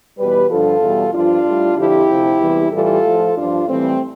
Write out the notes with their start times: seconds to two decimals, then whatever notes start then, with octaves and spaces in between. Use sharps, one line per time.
0.17 E2 B2 G3 G4 B4
0.49 G2 D3 F3 F4 A4
0.81 E2 B2 G3
1.13 G2 F3 D4 F4
1.45 A2 G3
1.76 F2 D3 F3 E4 G4
2.09 D2 C3 F3
2.40 E2 C3 E3 G3
2.72 A2 E3 G3 F4 A4
3.04 A2 F3
3.36 G2 F3 D4 F4
3.68 A2 E3 G3 A3 C4